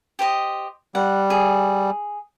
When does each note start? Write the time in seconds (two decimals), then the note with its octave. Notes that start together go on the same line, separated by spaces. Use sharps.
0.19 G4 C5 D#5
0.95 G3 F#5
1.30 G#4